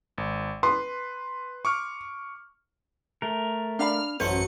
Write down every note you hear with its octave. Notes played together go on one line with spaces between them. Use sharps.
G#1
B4 C6
C#6 D6 F6
A3 A#4
D4 F5 B5 F6
A1 F#2 F#3 A3 B4 C5 C#7